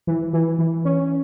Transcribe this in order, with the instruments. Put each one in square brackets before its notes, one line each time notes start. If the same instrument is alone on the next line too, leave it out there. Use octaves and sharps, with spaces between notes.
[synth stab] E3
E3
E3
C#4